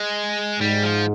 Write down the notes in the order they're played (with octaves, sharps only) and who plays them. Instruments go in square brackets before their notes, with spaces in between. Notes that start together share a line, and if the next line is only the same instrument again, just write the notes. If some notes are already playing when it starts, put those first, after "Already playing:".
Already playing: [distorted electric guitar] G#3
[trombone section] G#2 [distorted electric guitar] G3
[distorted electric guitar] F3